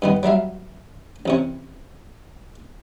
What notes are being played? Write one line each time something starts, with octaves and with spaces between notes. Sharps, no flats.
G2 D#3 B3
F#3 G3 E5 F5
A1 C3 C#5